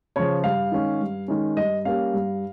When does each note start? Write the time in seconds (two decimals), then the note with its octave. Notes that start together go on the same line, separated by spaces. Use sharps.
0.16 C#3 F3 C#5
0.44 G2 F5
0.72 D#3 G#3 C#4
1.01 G2
1.28 D#3 G#3 C#4
1.57 G2 D#5
1.85 G3 A#3 C#4 F5
2.14 G2